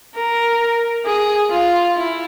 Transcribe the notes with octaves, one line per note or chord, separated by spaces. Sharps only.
A#4
G#4
F4
E4